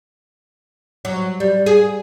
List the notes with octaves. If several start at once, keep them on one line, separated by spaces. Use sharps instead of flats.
F#3
G3
G#4